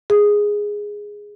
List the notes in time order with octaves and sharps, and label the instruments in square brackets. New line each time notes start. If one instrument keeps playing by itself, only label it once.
[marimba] G#4